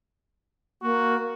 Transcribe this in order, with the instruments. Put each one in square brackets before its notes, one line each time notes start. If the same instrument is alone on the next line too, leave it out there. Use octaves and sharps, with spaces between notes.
[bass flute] A#3 [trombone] F#4